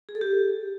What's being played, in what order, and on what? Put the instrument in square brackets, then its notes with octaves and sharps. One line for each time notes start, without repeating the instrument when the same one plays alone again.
[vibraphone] G#4
A4
G4